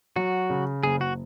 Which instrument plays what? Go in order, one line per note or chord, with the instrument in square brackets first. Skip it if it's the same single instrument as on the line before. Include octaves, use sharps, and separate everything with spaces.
[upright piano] F#3 [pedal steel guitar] F#4
[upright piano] C#3
[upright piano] F#1 [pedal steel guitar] G#4
[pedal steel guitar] F#4